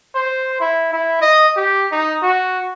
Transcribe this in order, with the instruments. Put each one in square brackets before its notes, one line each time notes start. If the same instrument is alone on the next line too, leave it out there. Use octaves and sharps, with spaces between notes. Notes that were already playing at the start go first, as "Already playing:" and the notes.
[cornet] C5
E4
E4
D#5
G4
D#4
F#4